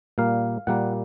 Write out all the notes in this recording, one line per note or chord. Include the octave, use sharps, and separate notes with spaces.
A#2 G3 A#3 F5
A#2 G3 A#3 F#5